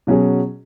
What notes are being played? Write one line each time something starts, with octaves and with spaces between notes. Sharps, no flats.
B2 F#3 C#4 G#4